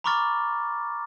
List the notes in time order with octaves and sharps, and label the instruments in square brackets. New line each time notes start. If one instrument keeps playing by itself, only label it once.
[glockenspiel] A#5 B5 C#6 D6 F6 A6